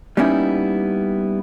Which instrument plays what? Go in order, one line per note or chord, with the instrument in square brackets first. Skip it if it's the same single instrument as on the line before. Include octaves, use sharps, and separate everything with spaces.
[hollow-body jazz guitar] G3 A#3 B3 C#4 D#4 E4